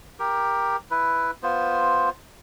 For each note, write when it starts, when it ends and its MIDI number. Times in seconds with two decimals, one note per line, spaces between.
0.19 0.76 67
0.19 0.76 70
0.91 1.31 64
0.91 1.31 71
1.43 2.09 59
1.43 2.09 65
1.43 2.09 72